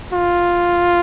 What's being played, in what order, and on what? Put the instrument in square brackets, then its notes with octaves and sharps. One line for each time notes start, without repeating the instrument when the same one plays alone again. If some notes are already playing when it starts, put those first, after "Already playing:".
[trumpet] F4